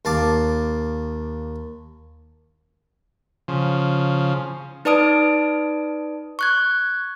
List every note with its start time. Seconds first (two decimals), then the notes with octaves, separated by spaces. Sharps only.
0.05 D#2 F5 A5 D6
3.48 C#3 F3
4.85 D#4 B4 D5 A5 D#6 D7
6.39 C#6 F#6 G#6